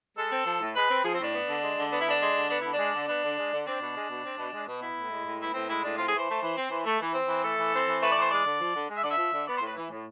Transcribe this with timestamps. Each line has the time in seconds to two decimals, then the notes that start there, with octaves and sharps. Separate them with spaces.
0.16 G#3 A4
0.31 C4
0.45 F3
0.60 A2
0.75 G#3 B4
0.89 C4
1.03 F3 G#4
1.13 C4
1.19 A2 D4
1.33 B3
1.48 D3
1.61 G#3
1.77 D3
1.91 B3 D4
2.00 E4
2.06 D3 D4
2.20 G#3
2.34 D3
2.49 B3 D4
2.61 D3 E4
2.73 D4
2.78 G#3
2.93 D3
3.07 B3 D4
3.22 D3
3.36 G#3
3.51 D3
3.65 C4 D4
3.79 B2
3.94 G#3
4.09 B2
4.24 C4
4.37 B2
4.52 G#3
4.67 B2
4.81 B3 E4
4.96 A2
5.11 G#3
5.25 A2
5.40 B3 E4
5.54 A2 C4
5.68 G#3 E4
5.83 A2 D4
5.97 C4 F4
6.07 G#4
6.12 E3 C5
6.27 A3
6.41 E3
6.56 C4
6.71 E3
6.84 A3
7.00 E3
7.14 C4
7.28 E3
7.43 A3 A4
7.57 E3
7.73 C4
7.87 E3
8.01 A3 B4
8.11 D5
8.16 E3 C5
8.30 G#3 D5
8.45 D3
8.59 F3
8.74 D3
8.88 G#3
8.96 E5
9.02 D3 D5
9.11 E5
9.18 F3
9.32 D3
9.47 B3 D5
9.56 C5
9.61 A2
9.66 B4
9.76 E3
9.89 A2